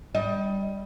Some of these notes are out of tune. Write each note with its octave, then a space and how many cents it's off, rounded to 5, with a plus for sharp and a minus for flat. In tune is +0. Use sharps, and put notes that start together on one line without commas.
G3 +0 D#5 +25